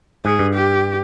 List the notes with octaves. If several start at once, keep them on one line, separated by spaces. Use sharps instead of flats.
G#2 G#4
G2
G4